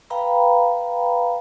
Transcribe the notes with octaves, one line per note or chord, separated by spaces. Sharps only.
B4 F5 G5 A#5 B5